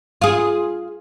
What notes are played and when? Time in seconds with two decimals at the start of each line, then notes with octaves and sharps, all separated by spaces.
0.22 F4 G#4